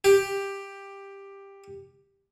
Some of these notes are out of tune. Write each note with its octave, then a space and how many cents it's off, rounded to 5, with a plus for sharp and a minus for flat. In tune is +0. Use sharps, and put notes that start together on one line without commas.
G4 +10